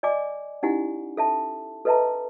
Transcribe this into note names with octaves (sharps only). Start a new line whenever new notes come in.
D5 D#5 G#5 D6
C#4 D#4 E4 G4 F#5 G#5
A4 E5 A5
A4 B4 D#5 E5 A5 A#5